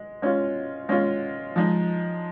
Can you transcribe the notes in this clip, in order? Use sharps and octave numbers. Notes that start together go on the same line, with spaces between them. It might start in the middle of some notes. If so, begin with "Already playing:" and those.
Already playing: G#3
G#3 C#4 F4
G#3 C#4 F4
F3 G#3 D#4